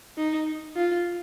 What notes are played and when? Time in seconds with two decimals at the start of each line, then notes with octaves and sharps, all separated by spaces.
0.17 D#4
0.76 F4